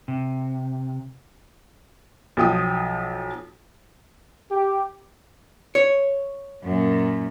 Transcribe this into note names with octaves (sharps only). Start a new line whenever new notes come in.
C3
B1 F3 G5 D#6
G4
C#5
F#2 A#2